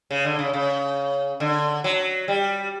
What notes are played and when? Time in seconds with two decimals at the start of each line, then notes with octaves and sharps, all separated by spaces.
0.11 C#3
0.25 D3
0.39 C#3
0.53 C#3
1.40 D3
1.84 F#3
2.28 G3